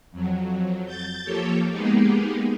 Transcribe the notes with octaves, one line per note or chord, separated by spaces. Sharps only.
F2 F#3
G6 A6
F3 A#3 G4 A4 C#5
G#3 A#3 B3 D#4 G4 G#4